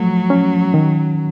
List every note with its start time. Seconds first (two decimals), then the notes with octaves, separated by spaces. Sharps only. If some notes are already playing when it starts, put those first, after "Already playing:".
Already playing: F3 F#3 A3
0.30 C#4
0.74 D#3